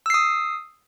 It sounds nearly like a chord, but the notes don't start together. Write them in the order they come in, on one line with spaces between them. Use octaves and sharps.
E6 C7 D#6